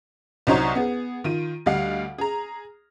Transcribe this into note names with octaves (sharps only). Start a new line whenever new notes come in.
C2 F#3 D#4 C5 C#5 A#5
B3 G#4
D#3 F4 D#7
D2 G3 D#5 F5 F#5
G#4 A#5